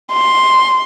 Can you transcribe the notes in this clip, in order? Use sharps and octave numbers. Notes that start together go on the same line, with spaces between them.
C6